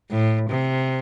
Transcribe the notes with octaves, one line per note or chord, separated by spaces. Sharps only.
A2
C3